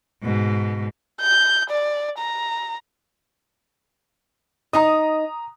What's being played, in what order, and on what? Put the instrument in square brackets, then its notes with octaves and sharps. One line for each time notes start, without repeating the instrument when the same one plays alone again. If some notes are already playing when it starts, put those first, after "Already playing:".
[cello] G#2 B2
[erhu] G6
D5
A#5
[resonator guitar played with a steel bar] D#4 D#5 [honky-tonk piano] A#5 D#6